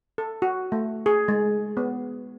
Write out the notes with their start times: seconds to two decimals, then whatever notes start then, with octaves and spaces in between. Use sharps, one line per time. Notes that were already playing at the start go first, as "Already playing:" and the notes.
0.18 A4
0.42 F#4
0.72 A3
1.06 G#4
1.28 G#3
1.77 B3